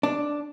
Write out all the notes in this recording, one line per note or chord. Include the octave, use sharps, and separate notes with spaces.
D4